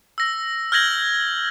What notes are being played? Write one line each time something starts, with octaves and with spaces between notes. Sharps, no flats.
E6 A#6
F6 G6 G#6 A#6 F#7 G7